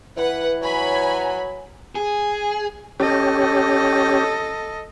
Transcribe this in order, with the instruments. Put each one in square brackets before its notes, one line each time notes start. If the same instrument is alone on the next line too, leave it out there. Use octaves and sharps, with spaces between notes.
[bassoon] E3 [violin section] B4 F#5
[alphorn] F#3 [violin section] C#5 G#5 B5
[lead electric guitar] G#4
[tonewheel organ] C#4 G4 [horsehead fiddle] A4 D#5